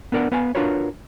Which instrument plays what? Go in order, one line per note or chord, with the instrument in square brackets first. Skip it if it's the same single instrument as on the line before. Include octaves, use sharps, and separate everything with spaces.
[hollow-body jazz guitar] B3 D4 A#4 D5 F#5
B3 B4 F5 G#5
D4 F4 F#4 A#4 B4 C#5